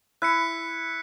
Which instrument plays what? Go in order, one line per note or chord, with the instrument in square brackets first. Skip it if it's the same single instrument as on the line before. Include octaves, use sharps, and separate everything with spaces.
[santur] E4 [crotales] F#6 B6 C#7